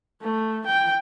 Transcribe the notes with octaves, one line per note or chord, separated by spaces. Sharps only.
A3
G5